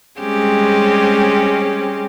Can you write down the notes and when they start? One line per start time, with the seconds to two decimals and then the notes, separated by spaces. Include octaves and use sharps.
0.20 G3 G#3 C4 C#4 G4 G#4